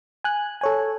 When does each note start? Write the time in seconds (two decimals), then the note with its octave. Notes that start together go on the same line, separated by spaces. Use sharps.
0.24 G#5 F#6
0.61 A4 C#5 G#5